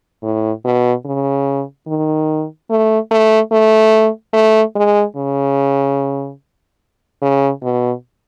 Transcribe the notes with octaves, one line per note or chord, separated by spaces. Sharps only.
A2
B2
C#3
D#3
A3
A3
A3
A3
G#3
C#3
C#3
B2